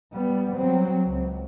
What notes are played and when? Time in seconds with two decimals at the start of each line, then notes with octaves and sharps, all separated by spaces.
0.13 G3 B3
0.55 F#3 C4
1.05 C#2